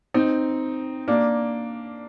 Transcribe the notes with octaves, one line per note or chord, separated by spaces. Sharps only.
C4 D#4
A#3 D4